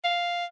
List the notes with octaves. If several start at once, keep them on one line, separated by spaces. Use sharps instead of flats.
F5